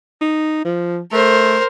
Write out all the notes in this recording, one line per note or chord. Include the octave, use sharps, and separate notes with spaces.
D#4
F3
A3 A#4 C5